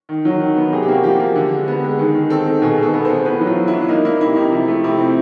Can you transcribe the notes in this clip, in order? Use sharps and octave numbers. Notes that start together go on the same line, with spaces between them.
D#3
F#3
D#3
B3
C3 G#4
G4
A#3 F#4
F3 G4
A#3
D3
G#3
B3
G#3
D#3 G#4
D#3
C4 A4
D#3
B2 G#4
B2
A4
B3
B3 C5
A2 B4
F#3
F4
F#3
E4
D4
A#3 D#4
A#3 E4
C3 E4
C3 D#4
F3 E4
A3
C3 E4
C4